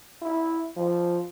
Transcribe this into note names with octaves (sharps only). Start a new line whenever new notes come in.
E4
F3